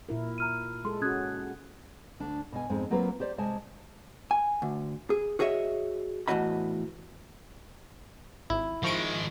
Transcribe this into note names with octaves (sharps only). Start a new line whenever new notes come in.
A#2 E4 A#4
A#5 F6 D#7
G#3 A4 C6
C#4 F#4 D#6 F#6 G#6
D2 D4
B2 G#5
F2 G#2 G#3 C4
F#3 A#3 C4 F4 A#4 B4
G4 C5 D5
C3 G#3 G#5 A5
G#5
D2
G#4
F#4 G#4 C#5 D#5 E5
E2 A2 C3 F#4 D#5 B5
G#1 E4
D#3 F3 G#3 C#6 D7